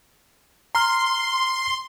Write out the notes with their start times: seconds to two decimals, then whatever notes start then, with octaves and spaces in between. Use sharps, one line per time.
0.75 A#5 C6 F6